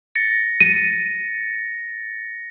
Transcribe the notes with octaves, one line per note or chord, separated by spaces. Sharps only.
A6 A#6 C#7
D#7